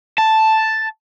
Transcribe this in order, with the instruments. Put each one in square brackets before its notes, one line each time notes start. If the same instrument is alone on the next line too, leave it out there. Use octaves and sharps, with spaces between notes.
[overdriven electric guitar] A5